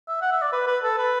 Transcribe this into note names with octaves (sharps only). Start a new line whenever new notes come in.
E5
F#5
E5
D5
B4
B4
A4
B4